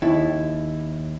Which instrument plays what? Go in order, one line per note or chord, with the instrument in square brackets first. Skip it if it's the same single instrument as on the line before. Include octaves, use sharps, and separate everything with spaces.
[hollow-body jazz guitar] D#2 E4